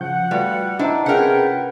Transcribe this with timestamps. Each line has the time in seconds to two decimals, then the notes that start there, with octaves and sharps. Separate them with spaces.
0.01 C#3 F3 F#5 G6
0.31 G3 A3 F4 F#4 B4 D5 F5
0.79 D4 E4 C5 D#5 E5 A5 A#5
1.06 C3 C#4 F4 G#4 A#4 B4 F#5 G5